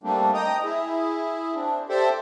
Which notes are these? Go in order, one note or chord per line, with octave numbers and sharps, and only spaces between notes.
G3 A3 A#3 C4 D4
D#5 G5 A#5 D#6
E4 G#4
C4 D4
G4 A4 C5 D5 E5